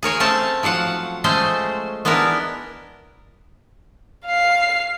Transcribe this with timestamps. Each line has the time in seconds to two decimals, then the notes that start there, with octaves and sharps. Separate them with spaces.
0.03 G#4 A#4 C#5 G#5
0.20 A3 C4 C#4 C#5 A5
0.63 F3 F#3 F5 F#5
1.24 G#3 A3 C#4 G#4 C5
2.05 G#3 B3 D4 E4 A#4
4.26 F5 C7